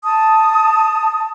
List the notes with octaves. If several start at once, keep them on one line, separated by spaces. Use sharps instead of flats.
A5 D#6